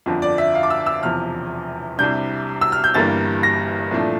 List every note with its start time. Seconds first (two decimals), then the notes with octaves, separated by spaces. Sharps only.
0.06 G1 F2 D3 F3
0.22 D5
0.38 E5
0.55 F5
0.63 D6
0.70 E6
0.86 E6
1.02 E1 E2 C3 F3 F6
1.98 C2 C3 G3 D4 G6
2.61 E6
2.72 F6
2.84 G6
2.94 G1 G2 E3 G3 A#3 A6
3.43 A#6
3.91 C2 A#2 F3 A3 D4